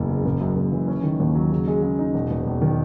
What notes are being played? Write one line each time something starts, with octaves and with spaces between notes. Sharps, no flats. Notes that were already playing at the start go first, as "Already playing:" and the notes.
Already playing: F#1 E2 E3
C#3
F#1
F#2
F#1
E3
C#4
D#3
D#2
F#3
C#3
G#3
C#3
D#4
E1
E2
E1
D#3